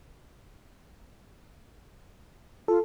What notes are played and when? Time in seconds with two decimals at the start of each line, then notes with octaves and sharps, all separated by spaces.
2.68 F4 A4